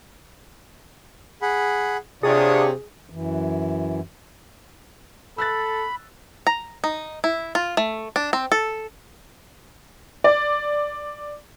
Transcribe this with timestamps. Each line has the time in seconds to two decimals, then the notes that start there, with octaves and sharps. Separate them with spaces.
1.42 G#4 F#5 B5
2.23 C3 D4 F4 G#4 C#5 D#6
3.10 F#2 E3
5.38 A4 B5 E6 F#6 A6
6.47 A#5
6.84 D#4
7.24 E4
7.55 F4
7.77 A3
8.16 D4
8.33 C4
8.52 A4
10.24 D5